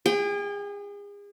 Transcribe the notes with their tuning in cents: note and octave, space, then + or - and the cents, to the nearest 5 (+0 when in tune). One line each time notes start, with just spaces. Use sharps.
G#4 -35 G5 +0